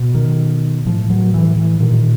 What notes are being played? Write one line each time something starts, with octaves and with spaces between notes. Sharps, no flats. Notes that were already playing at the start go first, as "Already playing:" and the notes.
Already playing: B2
D#3
A2 F3
F#3
E3
E3
A#2 D#3